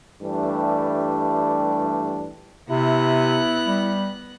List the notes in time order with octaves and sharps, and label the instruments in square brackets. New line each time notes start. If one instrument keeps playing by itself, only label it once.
[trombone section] G2 E3 G3 A3 D4
[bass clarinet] C3 [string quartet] B3 F#6 A#6 [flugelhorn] E4
[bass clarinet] G3